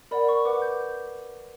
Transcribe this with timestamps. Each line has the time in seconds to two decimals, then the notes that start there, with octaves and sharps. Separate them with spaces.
0.11 A#4 D5 F#5 B5
0.28 C#6
0.45 B4 F#5 D6
0.62 G6